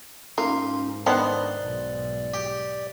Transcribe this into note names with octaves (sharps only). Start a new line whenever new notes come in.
G#2 A#3 C#4 D#4 F4
D#3 B3 D4 C5 D5 F#5
B1 G#2
G4